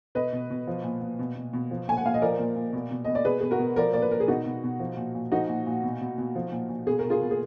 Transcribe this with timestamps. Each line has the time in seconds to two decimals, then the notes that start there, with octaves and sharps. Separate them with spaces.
0.15 B2 B4 D#5
0.33 B2
0.50 B2
0.67 F3
0.84 A#2
1.01 A#2
1.19 B2
1.36 B2
1.53 B2
1.71 F3
1.88 A#2 G#5
1.97 F#5
2.05 A#2 F5
2.14 D#5
2.22 F3 A#4 D5
2.39 A#2
2.56 A#2
2.73 B2
2.91 B2
3.05 B2 D#5
3.15 D5
3.25 B2 G#4 B4
3.41 B2 G#4
3.51 F#4 A#4
3.59 B2
3.76 F3 A#4 D5
3.93 A#2 D5
4.02 B4
4.11 A#2 A#4
4.20 G#4
4.28 B2 D#4 F#4
4.46 B2
4.64 B2
4.80 F3
4.97 A#2
5.15 A#2
5.32 F3 D#4 F#4
5.49 A#2
5.67 A#2
5.83 B2
6.01 B2
6.18 B2
6.35 F3
6.52 A#2
6.69 A#2
6.87 B2 G#4
6.99 A#4
7.05 B2
7.10 F4 G#4
7.21 B2
7.31 G#4